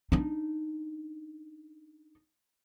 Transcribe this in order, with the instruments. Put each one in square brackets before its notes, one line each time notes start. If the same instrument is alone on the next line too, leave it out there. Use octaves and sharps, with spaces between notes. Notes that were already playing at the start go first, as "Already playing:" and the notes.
[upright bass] D4 D#4